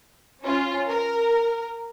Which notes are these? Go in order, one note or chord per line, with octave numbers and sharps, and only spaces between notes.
C#4 F4
A#4